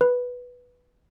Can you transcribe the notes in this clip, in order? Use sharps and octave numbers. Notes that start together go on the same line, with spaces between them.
B4